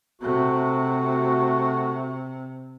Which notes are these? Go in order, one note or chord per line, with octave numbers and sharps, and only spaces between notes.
C3 A3 F#4